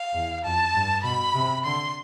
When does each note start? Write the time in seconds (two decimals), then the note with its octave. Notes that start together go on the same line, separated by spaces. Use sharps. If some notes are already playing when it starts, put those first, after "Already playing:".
Already playing: F5
0.13 E2
0.44 F2 A5
0.74 G2
1.04 B2 B5
1.34 C3
1.64 D3 C6